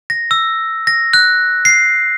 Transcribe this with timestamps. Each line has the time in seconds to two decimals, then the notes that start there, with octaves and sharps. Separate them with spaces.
0.10 A#6
0.31 E6
0.87 A#6
1.13 F#6
1.65 C7